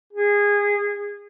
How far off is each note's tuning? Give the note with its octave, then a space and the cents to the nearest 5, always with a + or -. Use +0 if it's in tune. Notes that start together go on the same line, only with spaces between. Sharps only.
G#4 -20